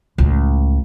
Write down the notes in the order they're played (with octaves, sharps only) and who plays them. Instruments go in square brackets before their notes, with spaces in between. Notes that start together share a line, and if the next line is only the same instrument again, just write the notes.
[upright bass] C#2 A2